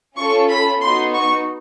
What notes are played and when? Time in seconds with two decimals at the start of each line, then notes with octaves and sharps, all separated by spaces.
0.17 C#4 F4 A4 C#6
0.49 B5
0.81 B3 D#4 F#4 C6
1.14 C#6